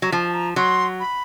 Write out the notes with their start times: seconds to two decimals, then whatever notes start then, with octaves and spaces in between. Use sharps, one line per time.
0.02 F#3
0.12 F3 A5
0.28 A5
0.34 A#5
0.56 F#3 C6
1.00 B5